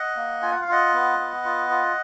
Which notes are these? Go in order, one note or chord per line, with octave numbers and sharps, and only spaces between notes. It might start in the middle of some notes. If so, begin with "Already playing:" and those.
Already playing: D#5 F#5
A#3
F4 G#5
F#5
F5
F4 D#5 F#5
B3
B3
F4
F4